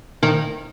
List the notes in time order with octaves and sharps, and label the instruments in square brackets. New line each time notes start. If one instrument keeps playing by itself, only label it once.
[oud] D#3